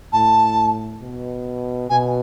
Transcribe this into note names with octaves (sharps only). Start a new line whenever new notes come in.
A2 A5
B2
B2 G#5